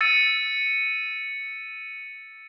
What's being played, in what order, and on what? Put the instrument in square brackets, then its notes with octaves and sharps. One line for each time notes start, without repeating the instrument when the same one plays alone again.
[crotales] E6 A6 C#7 D#7